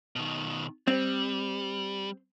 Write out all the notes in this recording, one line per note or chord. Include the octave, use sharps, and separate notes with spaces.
B2 D#3
G3 C4